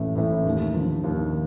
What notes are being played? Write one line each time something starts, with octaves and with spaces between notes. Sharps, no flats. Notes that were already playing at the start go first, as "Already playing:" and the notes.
Already playing: A1 A2 E3 A3
A2 E3 A3
D#2
D3 F3
D#2